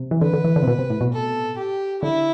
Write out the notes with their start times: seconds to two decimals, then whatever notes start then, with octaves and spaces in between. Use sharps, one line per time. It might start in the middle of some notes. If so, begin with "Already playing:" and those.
Already playing: C3
0.11 E3
0.21 D3 B4
0.33 D3
0.44 E3
0.56 D3
0.63 C3
0.67 B2
0.79 C3
0.90 A2
1.01 B2
1.12 A4
1.57 G4
2.02 D3 E4